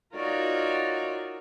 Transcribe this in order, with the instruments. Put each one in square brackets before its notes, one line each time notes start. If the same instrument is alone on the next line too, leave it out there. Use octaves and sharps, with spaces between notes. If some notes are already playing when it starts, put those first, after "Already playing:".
[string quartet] D#4 F4 F#4 A#4 C#5 D5